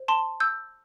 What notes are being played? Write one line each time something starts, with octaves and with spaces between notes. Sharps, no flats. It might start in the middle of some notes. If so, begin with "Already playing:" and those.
Already playing: C5
A5 C6
E6 G6